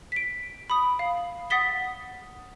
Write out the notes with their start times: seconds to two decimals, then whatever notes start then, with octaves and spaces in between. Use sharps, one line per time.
0.12 B6 D7
0.70 B5 D#6
0.99 F5
1.50 F#5 D#6 A6 B6 G7